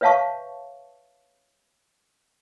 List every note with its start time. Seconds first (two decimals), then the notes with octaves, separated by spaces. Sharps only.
0.01 B4 C#5 E5 F5 A5 C#6